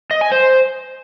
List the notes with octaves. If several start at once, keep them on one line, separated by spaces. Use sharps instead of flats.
D#5
G#5
C5